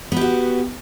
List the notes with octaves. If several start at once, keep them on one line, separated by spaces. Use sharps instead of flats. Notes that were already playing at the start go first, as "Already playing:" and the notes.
B3 F#4 G4